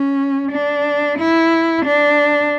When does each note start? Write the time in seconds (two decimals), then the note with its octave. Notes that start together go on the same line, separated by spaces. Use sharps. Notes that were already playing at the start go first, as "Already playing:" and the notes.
Already playing: C#4
0.51 D4
1.19 E4
1.85 D4